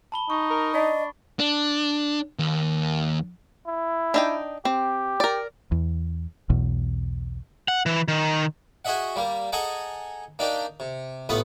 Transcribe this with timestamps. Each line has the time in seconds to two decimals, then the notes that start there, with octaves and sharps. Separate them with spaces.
0.12 A5 B5 G7
0.30 D#4 C#6
0.50 A#4
0.74 D4 D#5
1.39 D4
2.39 D#2
3.67 E4
4.14 D4 D#4 G5
4.65 C4 G4
5.20 A#4 D5
5.72 E2
6.50 B1 E2 B2
7.68 F#5
7.86 E3
8.08 D#3
8.85 F#4 G#4 D#5 E5 F#5
9.16 G3 A#3
9.52 G#4 A4 D#5 F#5 G#5 A#5
10.39 A#3 D4 D#4 G4
10.80 C3
11.29 A1 A3 B3 F4 B4 D#6